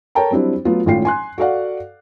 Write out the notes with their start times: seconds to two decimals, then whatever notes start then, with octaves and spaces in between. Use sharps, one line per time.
0.15 A4 A#4 C#5 G5 A5 A#5
0.31 F#3 G3 C4 D4 E4
0.65 F#3 A3 B3 F4
0.86 G#1 A2 C#4 F4 G5 C7
1.05 G#5 C6 F#6
1.38 F#4 A4 D5 F5 F#5